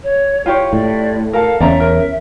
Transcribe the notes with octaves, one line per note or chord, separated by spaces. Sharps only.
C#5
E4 F4 G4 C#5
A2 D5
A4 A#4 F5
E2 C4 C#4 D5 E5 A#5
A#4